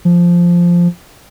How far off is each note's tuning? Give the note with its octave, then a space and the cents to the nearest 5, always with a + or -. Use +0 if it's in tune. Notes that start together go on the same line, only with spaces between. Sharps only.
F3 -5